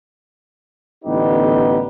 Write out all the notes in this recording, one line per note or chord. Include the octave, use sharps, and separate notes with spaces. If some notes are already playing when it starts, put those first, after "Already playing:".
A1 D3 B3 D#4 G4 B4